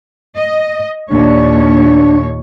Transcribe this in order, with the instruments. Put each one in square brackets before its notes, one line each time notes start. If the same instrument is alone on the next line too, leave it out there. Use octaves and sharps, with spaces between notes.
[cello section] D#5
[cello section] D#2 A#2 C#5 [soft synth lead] D4